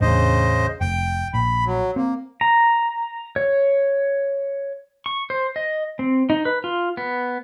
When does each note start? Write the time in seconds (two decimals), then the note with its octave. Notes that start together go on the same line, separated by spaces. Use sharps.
0.01 A1 E2 C#3 D4 C5 D#5
0.81 F1 G5
1.34 A#1 B5
1.66 F#3
1.96 A#3 C4
2.41 A#5
3.36 C#5
5.06 C#6
5.30 C5
5.56 D#5
5.99 C4
6.30 D#4
6.45 B4
6.64 F4
6.97 B3